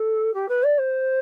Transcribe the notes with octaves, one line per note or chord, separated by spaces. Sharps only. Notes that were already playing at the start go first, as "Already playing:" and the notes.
Already playing: A4
G4
B4
D5
C5